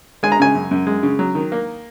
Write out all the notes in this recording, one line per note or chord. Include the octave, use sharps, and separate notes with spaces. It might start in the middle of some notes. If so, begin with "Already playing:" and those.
G#3 G#5
A#5
C#3 G#5
F#2
F#2
G#3
C#3
F#3
D#3
A#3